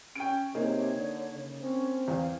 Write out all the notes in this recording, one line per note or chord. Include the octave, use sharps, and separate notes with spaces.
C#4 G5 D7
C3 A#3 D#4 G#4 C#5
D3
C#3
C4 C#4
E2 F5